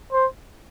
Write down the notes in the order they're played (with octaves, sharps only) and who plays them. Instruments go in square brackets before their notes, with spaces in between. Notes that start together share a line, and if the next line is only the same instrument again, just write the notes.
[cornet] C5